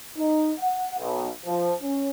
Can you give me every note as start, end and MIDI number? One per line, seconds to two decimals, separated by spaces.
0.17 0.51 63
0.59 0.94 78
0.98 1.27 35
1.45 1.72 53
1.81 2.10 61